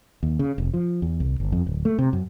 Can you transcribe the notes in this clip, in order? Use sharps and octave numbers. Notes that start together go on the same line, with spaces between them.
D#2
C#3
F1
F3
E2
C2
G1
F2
D1
A3
C3
F#2